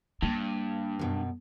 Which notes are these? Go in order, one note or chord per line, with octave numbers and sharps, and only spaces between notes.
G2 A#3
F#2 B2